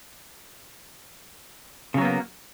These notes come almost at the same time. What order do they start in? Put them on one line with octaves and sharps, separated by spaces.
C#3 F#3 B3 A#3